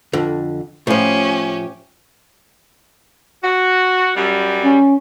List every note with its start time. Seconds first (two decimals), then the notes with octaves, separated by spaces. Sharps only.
0.13 F2 D3
0.87 A2 F3 C#4 G4
3.43 F#4
4.14 F#2 G3
4.63 C#4